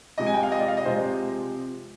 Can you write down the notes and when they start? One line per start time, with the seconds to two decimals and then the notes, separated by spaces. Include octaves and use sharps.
0.18 C3 F3 G#3 D#5
0.26 G#5
0.34 G5
0.43 F5
0.52 D#5
0.59 D5
0.68 F5
0.77 D#5
0.84 C3 F3 G#3 C5